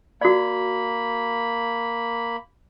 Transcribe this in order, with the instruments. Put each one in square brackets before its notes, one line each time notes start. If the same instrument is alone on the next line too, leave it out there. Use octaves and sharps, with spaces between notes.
[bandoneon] A#3 B5 [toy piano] F#4 D5